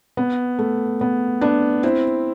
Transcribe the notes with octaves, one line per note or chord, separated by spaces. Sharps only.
B3
A3
B3
B3 D4
C4 E4